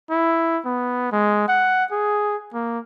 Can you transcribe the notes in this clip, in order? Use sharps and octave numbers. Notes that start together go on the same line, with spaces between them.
E4
B3
G#3
F#5
G#4
A#3